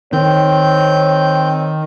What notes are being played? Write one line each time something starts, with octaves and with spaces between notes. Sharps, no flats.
D#3 C4 C#5 G6